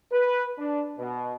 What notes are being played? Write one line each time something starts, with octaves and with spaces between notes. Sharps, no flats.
B4
D4
B2